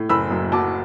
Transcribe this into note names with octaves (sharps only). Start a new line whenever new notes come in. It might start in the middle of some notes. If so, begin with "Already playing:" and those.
Already playing: A2
F#1 B5 E6
F#2
F#3 A5 D6